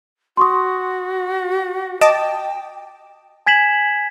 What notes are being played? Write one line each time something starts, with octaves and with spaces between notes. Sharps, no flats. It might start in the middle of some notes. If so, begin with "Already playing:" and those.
F#4 C6 C#6 D#6
D#5 G5 A5 D6 E7
G#5 G#6 B6 E7 F#7